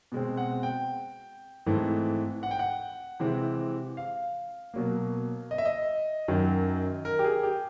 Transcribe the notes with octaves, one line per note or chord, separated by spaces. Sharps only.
B2 G#3 C4
F#5
G5
G#2 E3 A3 C4
F#5
G5
F#5
C3 E3 G#3 C4
F5
B2 F#3 A#3
D#5
E5
D#5
F#2 D#3 F#3
A#4
G4
G#4
G4